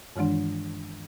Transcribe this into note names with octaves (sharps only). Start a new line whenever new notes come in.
G2 D#3 E3 G#3 D4